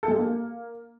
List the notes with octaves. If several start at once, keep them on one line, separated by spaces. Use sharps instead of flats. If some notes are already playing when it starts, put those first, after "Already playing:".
A4
G#3
G4
A#3